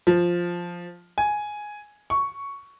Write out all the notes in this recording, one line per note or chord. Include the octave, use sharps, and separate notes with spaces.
F3
G#5
C#6